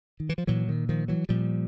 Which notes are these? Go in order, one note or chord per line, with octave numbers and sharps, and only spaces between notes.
D#3
E3
F3
A#2 E3 F#3
D#3
D#3 F3
E3 F#3
A#2 F3 G3